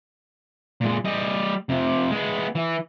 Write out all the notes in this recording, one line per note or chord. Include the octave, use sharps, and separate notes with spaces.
A#2 G#3
G3 D#5
F2 C3
G#3 B3
E3